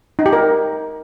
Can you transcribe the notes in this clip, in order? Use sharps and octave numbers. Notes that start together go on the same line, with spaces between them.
D#4
G4
A#4